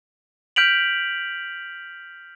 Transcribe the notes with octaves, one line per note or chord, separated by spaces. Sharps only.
F6 G6 B6 D7 F7 F#7